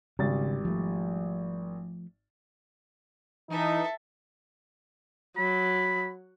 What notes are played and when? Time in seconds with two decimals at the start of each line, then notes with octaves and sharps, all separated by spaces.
0.19 G#1 C#3 G3 A6
0.65 F3 A3
3.50 E3 D#4 A4 E5
5.37 F#3 B5